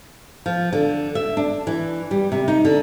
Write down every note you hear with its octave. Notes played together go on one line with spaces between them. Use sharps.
F3
D3
E5
D4
E3
G3
C3
D#4
D3